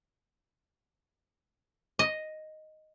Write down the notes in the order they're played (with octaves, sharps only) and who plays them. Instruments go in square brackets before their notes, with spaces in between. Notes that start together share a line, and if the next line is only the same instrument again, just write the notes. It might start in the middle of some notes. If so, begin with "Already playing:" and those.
[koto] D#5